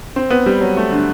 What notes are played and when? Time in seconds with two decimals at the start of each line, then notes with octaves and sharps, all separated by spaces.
0.16 C4
0.30 B3
0.46 G3
0.61 F#3
0.77 A3
0.92 D3